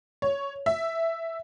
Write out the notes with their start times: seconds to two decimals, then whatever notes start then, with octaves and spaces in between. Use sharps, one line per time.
0.22 C#5
0.66 E5